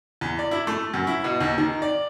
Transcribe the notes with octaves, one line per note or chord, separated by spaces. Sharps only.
E2
D5
E4
A3
F#2
E4
B2
D#2
D#3
D5